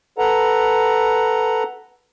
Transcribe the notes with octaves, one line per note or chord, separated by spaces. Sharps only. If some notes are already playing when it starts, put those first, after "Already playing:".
A4 B4 F#5 A#5